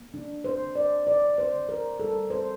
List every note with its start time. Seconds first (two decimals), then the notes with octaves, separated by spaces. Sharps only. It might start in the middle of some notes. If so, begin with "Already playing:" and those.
Already playing: A#3
0.14 D3 D4
0.45 C5
0.61 D3
0.75 D5
1.06 D3 D5
1.38 C5
1.53 D3
1.69 A#4
2.00 G3 A4
2.30 C5